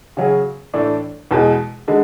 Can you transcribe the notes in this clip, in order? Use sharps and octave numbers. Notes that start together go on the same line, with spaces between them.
C#3 F#3 C#4 G#4
A2 E3 A3 D4
E2 B2 G#3
D3 G#3